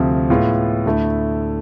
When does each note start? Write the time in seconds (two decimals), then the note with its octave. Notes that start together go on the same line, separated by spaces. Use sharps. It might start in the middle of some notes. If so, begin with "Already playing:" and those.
Already playing: D2 C3 F3
0.30 A2 G#3 B3 F4
0.86 D2 D3 A3 E4